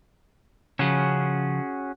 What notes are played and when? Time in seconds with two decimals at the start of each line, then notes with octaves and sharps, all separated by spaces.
0.79 C#3 F3 C#4 F#4 G#4